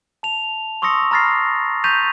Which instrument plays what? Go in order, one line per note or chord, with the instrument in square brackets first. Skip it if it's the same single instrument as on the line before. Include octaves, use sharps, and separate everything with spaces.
[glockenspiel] A5 F7
C6 C#6 D#6 E6 A#6 C#7
A#5 B5 F6 A6 A#6 C7
C#6 G6 A6 B6 D#7 F7